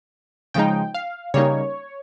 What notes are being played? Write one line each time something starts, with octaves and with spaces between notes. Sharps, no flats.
C#3 F3 G#3 D#4 G5
F5
C#3 G3 A#3 D#4 C#5